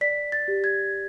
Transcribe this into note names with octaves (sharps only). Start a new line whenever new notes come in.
D5 B6
A6
G4
G#6